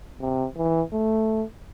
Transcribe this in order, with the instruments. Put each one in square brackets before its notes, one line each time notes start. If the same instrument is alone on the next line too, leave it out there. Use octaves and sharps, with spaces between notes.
[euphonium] C3
E3
A3